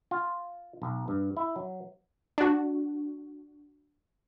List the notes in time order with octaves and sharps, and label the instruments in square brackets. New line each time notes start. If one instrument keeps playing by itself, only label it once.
[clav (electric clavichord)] F4
B1
G2
E4
F#3
[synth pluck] D4 F#4